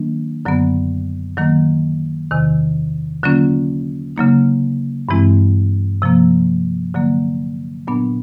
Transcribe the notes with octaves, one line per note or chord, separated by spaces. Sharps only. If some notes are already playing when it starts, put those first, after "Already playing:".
Already playing: D#3 F#3 A#3 D4
F#2 D3 F#3 B3
D#3 F#3 A#3
E2 C3 D#3
D3 F#3 A#3 C#4 F4
C#3 F#3 A#3 D#4
G2 E3 G#3 C4 E4
C3 F3 A#3
D3 F#3 A#3
A#2 F#3 B3 D4